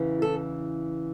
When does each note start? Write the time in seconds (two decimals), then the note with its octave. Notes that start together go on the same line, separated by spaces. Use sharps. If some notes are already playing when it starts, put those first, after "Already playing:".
Already playing: E2 C#3 E3
0.22 A4